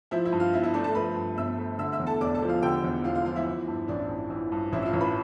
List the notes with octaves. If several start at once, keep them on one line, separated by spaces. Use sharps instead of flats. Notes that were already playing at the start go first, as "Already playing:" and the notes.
F3 E4 E5
E4 E5
G2
F4 F5
G1 E4 E5
E4 E5
A3 D4 D5
A4 A5
F3 B4 B5
G2
G1 E5 E6
A3
D3 E5 E6
E5 E6
E2
A4 A5
E1 D5 D6
A4 A5
F3
F4 F5
D3 G4 G5
E2
E1 F4 F5
F4 F5
F3 F4 F5
E4 E5
E3
G2
A1 D4 D5
A1
E3
G2
A1 E4 E5
E5
F4 F5
A1
B4 B5